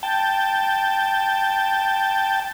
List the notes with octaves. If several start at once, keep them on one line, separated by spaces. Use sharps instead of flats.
G5 A5